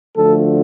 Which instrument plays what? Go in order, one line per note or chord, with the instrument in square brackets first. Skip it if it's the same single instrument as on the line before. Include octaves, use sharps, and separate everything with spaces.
[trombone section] D2 D3 F3 A3 A4